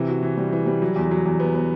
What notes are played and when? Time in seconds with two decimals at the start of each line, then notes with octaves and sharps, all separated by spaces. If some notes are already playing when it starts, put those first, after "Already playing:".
Already playing: C3 E3
0.08 F#4
0.23 E3
0.37 G3
0.52 E3
0.66 G3
0.82 F#3
0.96 E2
1.11 F#3
1.26 E2
1.40 B3
1.55 B3